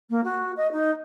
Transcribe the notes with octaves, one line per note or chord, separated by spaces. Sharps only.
A#3
F#4
D#5
D#4